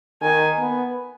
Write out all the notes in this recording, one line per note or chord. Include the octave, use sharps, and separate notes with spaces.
D#3 G#5
B3